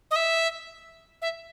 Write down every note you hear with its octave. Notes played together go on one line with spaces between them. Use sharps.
D#5
E5
E5